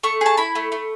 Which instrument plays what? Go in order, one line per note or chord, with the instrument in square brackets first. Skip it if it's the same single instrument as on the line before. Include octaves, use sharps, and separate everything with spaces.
[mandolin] A3 C#6
G#4 A5
E4 B5
A3
A3